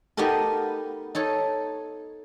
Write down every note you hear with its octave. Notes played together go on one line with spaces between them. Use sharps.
B3 D#4 F#4 G4 A4 A#4
D#4 A4 C#5